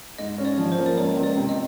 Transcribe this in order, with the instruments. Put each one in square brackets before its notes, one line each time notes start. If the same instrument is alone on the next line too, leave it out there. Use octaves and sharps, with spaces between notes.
[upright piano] G#2 [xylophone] D#5
[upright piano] C#4
[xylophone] D5
[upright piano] F3
[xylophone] C5
[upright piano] A#3
[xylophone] D5
[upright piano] C#2 [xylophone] C#5
[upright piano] C#2
[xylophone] D5
[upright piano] C3
[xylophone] D#5